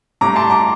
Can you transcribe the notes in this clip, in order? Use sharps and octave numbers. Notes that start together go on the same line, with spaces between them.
A2 G3 A#5 D6
A5 C6
A#5 D6